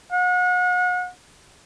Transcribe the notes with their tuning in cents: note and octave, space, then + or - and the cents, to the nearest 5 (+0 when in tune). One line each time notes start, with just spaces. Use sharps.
F#5 -35